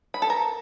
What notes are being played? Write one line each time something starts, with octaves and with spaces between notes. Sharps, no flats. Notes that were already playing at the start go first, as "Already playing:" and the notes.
B5
A4
A#4